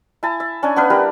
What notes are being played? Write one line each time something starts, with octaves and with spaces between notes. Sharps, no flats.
E4 G#5 A5
E5
C#4 D4 G#5
B3 D4 B4 F5
G3 E4 G4 A#4